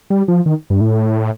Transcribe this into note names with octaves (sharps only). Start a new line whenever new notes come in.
G3
F3
D#3
G2
A2